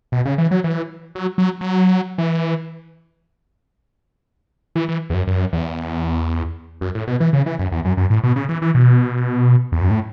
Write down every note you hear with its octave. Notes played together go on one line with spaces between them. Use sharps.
B2
C#3
E3
F#3
E3
F#3
F#3
F#3
E3
E3
E3
E2
F#2
F#2
E2
F#2
A2
B2
E3
C#3
E3
F#2
E2
F#2
F#2
A2
B2
C#3
E3
E3
B2
E2
F#2
A2